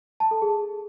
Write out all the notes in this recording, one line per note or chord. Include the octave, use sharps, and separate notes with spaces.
A5
A4
G#4